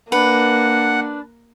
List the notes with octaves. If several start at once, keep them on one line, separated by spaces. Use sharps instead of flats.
A#3 D4 B4 F#5